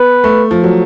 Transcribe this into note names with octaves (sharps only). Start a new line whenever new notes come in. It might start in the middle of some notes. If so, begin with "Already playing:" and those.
Already playing: B3 B4
A3
F3
F#3